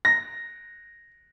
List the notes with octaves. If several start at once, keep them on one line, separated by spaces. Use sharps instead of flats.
A#6